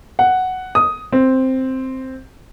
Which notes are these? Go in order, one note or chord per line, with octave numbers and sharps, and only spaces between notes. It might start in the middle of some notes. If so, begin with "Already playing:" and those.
F#5
D#6
C4